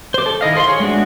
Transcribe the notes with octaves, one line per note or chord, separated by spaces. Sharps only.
C5 D6
A4
D#3 E4 D#5 F5
A4 C5 F5 B5 C6
G#4 C#5
G#3 A3 B3 D4 F#4